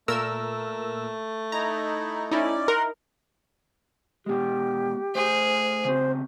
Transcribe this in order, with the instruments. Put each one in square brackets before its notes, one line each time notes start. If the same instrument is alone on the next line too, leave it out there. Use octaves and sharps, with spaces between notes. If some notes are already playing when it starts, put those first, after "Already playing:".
[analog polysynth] A#2 A#4 E6 [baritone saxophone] A3
[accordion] D#4 E4 [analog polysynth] A#5
[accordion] C#4 D5 [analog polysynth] D#4 E4
[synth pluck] A#4 [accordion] F#5 C6
[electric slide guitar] B2 G#3 [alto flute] G4
[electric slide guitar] A3 C5 [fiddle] G#4
[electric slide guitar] C#3 C4 F#4 [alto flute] C5